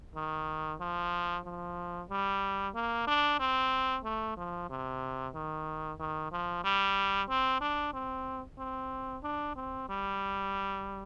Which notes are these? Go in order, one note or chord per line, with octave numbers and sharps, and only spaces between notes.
D#3
F3
F3
G3
A#3
D4
C4
A3
F3
C3
D#3
D#3
F3
G3
C4
D4
C4
C4
D4
C4
G3